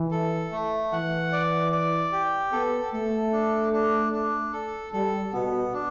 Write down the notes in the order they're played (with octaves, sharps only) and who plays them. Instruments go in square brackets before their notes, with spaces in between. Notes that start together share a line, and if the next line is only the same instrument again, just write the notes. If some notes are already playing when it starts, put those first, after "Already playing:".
Already playing: [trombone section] E3
[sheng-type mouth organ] A4
A3
[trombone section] E3 [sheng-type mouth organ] F#5
[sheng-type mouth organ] D5
D5
G4
[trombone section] B3 [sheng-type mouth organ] A4
[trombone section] A3 [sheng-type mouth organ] A4
[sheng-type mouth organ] D4
D4
D4
A4
[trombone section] G3 [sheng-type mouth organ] A4
[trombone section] B2 [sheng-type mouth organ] B3
[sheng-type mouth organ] D4